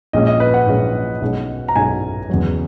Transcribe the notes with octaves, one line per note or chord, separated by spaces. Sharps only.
A#1 A#2 G#3 C#4 D#5
D#5
B4
F#5
A#1 A#2 G#3 C#4
B1 B2 G#3 C#4
A#5
B1 B2 G#3 C#4 G#5
E2 C#3 F#3